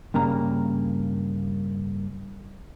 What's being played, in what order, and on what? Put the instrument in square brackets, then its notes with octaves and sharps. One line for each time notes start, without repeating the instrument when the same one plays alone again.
[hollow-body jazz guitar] G2 C#3 A#3 A#5